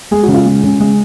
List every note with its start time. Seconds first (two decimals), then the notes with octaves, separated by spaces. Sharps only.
0.11 G#3 G#4
0.23 F#4
0.28 C#3
0.34 F4
0.46 G#3
0.63 C#3
0.80 G#3